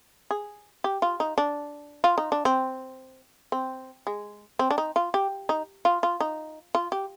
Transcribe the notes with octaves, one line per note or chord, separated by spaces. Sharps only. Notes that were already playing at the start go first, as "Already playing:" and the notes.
G#4
G4
F4
D#4
D4
F4
D#4
D4
C4
C4
G#3
C4
D4
D#4
F4
G4
D#4
F4
F4
D#4
F4
G4